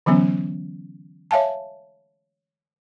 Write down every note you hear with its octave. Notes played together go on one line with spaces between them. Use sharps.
D3 E3 F#3 B3 C#4
C#5 E5 F5 G#5 A5